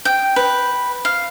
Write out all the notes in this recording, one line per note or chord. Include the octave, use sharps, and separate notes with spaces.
G5
B4
F5